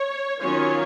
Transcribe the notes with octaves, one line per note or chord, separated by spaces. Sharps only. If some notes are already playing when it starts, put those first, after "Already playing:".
Already playing: C#5
D#3 F#3 C#4 F4 C#5